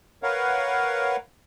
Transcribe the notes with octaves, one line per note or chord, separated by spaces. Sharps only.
A#4 B4 C#5 F5 F#5